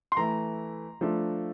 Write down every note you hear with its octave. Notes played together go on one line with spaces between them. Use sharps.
C6
E3 A3 E4 A#5
F3 A3 D4 A4